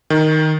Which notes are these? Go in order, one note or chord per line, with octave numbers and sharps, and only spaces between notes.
D#3